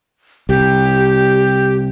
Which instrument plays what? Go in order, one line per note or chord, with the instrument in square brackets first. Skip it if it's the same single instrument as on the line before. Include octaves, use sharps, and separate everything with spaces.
[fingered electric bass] C2 [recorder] G4